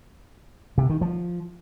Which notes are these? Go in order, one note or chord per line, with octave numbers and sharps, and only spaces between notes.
C3
D#3
F3